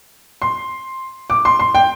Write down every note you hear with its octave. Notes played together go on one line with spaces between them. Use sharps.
C6
D6
C6
C6
G5